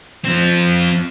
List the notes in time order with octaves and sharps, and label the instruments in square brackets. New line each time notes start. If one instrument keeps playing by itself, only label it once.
[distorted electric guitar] F3 C4